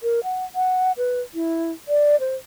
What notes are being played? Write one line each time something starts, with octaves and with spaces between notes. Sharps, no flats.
A#4
F#5
F#5
B4
E4
D5
C5